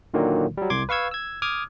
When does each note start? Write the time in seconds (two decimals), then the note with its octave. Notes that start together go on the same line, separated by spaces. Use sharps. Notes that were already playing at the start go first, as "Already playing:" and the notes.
0.14 A#2 D3 D#3 F#3 A#3
0.57 F#3 G3
0.70 C2 C6 D6 G#6
0.89 B4 F5 C#6 E6 G#6
1.11 E6 G#6
1.42 D6 D#6 F6 G#6